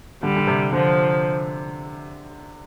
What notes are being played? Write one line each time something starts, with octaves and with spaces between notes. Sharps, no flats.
D3 G3
D3
C3
D3 F3